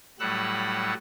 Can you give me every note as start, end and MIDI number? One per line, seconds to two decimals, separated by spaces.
0.20 0.94 45
0.20 0.94 54
0.20 0.94 55
0.20 0.94 78
0.20 0.94 88
0.20 0.94 90